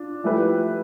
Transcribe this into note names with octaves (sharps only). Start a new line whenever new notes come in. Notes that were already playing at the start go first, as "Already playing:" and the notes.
Already playing: D4 F4
F3 A3 E4 G4 B4